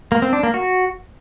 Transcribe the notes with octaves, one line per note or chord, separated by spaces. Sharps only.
A#3
C4
D4
A#3
F#4